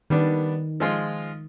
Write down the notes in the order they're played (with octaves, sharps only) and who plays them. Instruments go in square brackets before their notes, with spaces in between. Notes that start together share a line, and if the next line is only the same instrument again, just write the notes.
[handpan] D#3 [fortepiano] G3 B3 D4
[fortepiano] F3 G#3 F4